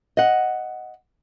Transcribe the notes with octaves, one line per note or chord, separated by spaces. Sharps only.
D#5 F#5